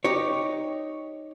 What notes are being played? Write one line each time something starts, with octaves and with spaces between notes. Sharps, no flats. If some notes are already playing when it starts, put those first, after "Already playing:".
D#4 G4 C#5